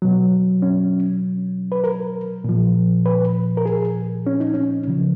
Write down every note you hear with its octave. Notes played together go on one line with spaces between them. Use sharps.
B2 F#3
C#4
B4
A#4
A#2 F3
B4
A#4
G#4
C#4
D#4
C#4
C#3 F3